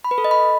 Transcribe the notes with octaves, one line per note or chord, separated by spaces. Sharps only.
B5
B4
A4
D#5
B5